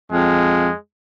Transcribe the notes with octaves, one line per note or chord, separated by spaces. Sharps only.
F2 G#3